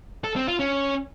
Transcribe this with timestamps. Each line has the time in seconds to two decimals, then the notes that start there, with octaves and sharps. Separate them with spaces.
0.24 A4
0.36 C4
0.48 F4
0.60 C#4